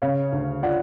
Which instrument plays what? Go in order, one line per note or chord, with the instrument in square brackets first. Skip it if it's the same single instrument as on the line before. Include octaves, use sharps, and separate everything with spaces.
[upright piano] C#3 [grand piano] C#5 F5
[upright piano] D2
[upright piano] F4 [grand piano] D5 F#5